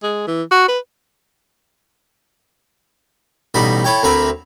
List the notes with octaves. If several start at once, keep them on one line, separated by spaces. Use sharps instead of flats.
G#3
E3
F#4
B4
A1 B2 G3 D#4 B5
E4 A4 C#5 G5
D2 D3 C4 A#4 E5 B5